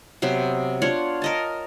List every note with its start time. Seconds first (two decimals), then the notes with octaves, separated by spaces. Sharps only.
0.22 C3 F#3 B3 C5
0.82 D4 F4 C#5 F#5
1.22 A#4 D#5 A5